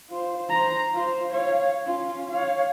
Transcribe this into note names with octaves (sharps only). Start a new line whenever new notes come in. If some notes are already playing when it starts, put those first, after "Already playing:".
F4 C5
C5 A#5
F4 C5
C#5 F5
C#4 F4
C#5 F5